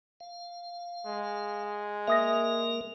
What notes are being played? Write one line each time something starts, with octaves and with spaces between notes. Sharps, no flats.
F5
G#3
A#3 A#4 E5 D#6 A#6